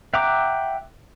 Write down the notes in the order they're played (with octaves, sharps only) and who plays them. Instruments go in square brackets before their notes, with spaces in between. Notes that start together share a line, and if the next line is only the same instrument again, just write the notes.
[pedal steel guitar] E5 F#5 G5 A#5 D6